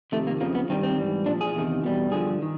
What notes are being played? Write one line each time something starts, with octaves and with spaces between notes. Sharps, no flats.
F2 C3 D#3 A3
A#3
F2 C#3 F3 A#3
B3
G2 D#3 G3 C4
C4
G#2 E3 G3
A#2 F3 D4
G#4
E2 C3 D#3
E2 B2 G3
G2 D3 F3 G#4
D#3